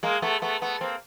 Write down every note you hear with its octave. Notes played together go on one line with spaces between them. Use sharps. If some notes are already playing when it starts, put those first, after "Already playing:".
G#3 A#3
A3 B3
A3 B3
A3 B3
A#3 C4